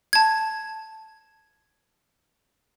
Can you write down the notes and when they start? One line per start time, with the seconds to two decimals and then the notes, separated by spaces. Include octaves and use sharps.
0.13 A5 G#6